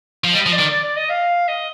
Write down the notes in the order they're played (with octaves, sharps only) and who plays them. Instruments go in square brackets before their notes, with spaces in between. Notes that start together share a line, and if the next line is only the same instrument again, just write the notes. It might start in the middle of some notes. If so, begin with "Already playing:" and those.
[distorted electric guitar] F3
[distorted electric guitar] G3 [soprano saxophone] D#5
[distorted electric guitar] F3
[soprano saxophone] D5
[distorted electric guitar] D#3
[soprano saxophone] D5
D5
D#5
F5
D#5